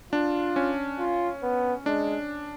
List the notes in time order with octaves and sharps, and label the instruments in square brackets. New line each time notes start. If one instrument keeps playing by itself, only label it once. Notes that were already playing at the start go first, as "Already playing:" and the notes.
[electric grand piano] D4 [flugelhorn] F4
[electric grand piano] C#4
[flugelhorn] F4
B3
[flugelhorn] G#3 [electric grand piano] D4